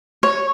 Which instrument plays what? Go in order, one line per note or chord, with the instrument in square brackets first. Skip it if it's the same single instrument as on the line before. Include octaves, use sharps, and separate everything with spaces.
[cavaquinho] C#5